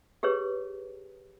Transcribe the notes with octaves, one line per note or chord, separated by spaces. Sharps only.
G4 G#4 B4 C#5